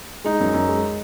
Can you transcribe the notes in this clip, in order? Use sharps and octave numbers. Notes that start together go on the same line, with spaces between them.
G#3 D#4
F#2
F#2
G#3